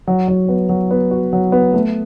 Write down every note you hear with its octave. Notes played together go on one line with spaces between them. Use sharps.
F#3
F#3
B3
F#3
B3
F#4
F#3
B3
A3